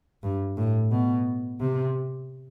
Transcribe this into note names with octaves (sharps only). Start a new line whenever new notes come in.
G2
A2
B2
C3